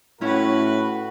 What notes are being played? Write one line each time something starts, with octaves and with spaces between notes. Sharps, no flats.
A2 C#4 E4 F#4 B4